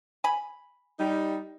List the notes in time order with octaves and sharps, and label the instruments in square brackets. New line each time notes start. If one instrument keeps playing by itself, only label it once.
[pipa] G#5 B5
[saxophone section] G3 D#4